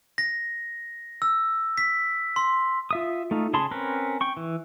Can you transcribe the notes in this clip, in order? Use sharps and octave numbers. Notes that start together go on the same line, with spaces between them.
A#6
E6
B6
C6
F4 E5 D#6
A3 D#4 F4
C#3 G#4 A5 B5 C6
C4 C#4 A#4 B4
G5 C#6
E3